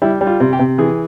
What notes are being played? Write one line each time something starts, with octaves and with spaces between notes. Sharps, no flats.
G3 E4
G3
F4
C3
G4
C3
E3 G#4